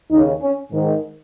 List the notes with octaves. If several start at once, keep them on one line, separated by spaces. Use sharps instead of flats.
D#2 C#3 D#4
C#4
G#2 D#3